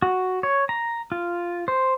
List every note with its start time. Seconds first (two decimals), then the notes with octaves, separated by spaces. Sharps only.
0.02 F#4
0.43 C#5
0.69 A#5
1.12 F4
1.68 C5